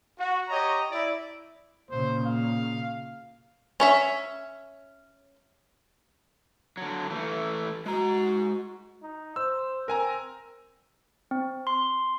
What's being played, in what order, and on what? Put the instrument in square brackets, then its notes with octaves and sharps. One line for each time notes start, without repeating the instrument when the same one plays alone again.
[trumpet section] F#4
G4 C#5 D#5 A#5
E4 D5
[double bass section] A#2 C#3 [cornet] C5
[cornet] F5
[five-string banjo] C#4 C#5 E5
[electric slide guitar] D3 F#3
E3 A3
[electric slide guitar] G#3 A#5 [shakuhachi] F#4
[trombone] D#4
[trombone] C5 [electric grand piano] E6
[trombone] C4 [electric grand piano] A#4 G#5 A#5
[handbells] C4
C6